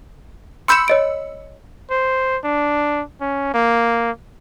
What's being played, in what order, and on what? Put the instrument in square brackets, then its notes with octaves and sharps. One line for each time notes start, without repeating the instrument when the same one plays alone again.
[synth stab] B5 E6 C#7 [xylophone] C6 G6 E7
[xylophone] C#5 D#5 D7
[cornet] C5
D4
C#4
A#3